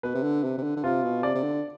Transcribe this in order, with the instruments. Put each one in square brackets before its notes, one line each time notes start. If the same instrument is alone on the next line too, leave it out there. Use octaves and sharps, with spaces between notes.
[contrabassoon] B2 [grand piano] B4
[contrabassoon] C3
D3
C3
C3
D3
D3
[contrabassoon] C3 [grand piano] F4
[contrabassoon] B2
[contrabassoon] C3 [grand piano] D5
[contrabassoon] C3
D3